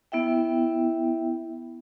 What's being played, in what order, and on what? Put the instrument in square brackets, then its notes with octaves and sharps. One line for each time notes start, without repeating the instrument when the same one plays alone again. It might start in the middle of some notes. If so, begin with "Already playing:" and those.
[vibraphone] B3 E4 E5 G5